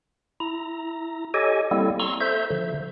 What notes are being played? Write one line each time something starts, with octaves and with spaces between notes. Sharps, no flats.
E4 A#5
G4 A4 C#5 D#5 G#5
G3 A#3 C4 E4 A4
A#5 C6 C#6 E6
A4 C5 E5 G6
D3 F3